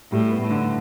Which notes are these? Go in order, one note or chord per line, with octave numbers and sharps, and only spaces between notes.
A2 G3
B3
A2
D3